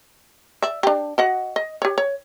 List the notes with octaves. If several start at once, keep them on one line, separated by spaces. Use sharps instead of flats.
D5 E5
D4 G4
F#4 D#5 F#5
D#5
G4 C#5
C#5